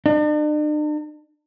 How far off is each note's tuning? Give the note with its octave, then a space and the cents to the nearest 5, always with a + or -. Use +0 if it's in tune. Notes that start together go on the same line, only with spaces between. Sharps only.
D4 +45